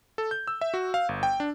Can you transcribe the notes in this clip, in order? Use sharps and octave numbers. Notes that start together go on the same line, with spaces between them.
A4
G6
E6
E5
F#4
F5
G1
G5
D4